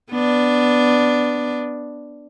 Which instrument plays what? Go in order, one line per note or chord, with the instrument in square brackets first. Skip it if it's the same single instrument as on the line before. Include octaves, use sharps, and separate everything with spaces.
[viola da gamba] B3 D4